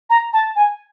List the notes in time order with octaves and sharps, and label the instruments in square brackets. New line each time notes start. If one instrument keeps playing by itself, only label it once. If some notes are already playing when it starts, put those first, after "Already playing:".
[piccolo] A#5
A5
G#5